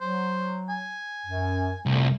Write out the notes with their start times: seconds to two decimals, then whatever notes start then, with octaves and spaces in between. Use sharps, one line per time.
0.01 F#3 C5
0.69 G#5
1.26 F#2
1.86 C2 F2 A#2 A3